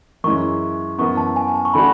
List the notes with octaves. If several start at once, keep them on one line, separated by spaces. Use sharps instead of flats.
F#2 E3 G#3 C#4 E4 C#6
F#2 E3 B3 C#6
A5
G#5
G#5
A5
C#6
D3 A3 D4 F#4 B5